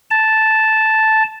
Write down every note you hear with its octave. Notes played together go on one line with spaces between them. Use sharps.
A5